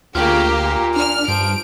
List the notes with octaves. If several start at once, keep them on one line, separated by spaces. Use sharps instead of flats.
D2 C#3 A#3 F4 G4
A#2
D4 F6
G2 F3 D7